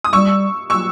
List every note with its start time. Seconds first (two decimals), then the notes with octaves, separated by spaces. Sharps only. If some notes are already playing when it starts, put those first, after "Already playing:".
0.04 D#6
0.13 G3 C#6 E6
0.70 C#6 E6